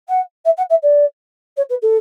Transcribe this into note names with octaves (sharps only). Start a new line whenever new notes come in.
F#5
E5
F#5
E5
D5
C#5
B4
A4